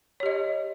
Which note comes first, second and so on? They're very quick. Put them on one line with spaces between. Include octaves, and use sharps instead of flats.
C#5 G4 D#5